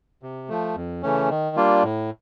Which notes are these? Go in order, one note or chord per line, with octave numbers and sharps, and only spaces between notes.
C3
F3 A3
F2
C#3 E3 A3 C#4
D#3
G3 A#3 D4 F4
A2